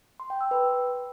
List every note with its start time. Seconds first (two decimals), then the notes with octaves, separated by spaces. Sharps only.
0.20 C6
0.30 G5
0.41 E6
0.51 B4